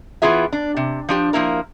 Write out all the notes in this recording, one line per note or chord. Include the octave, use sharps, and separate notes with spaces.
E3 B3 F4 G#4 E5
D4
C3
F3 D4 G4
F3 A#3 E4 A#4